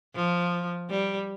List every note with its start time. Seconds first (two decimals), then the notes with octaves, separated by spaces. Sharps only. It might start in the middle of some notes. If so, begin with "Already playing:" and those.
0.15 F3
0.90 G3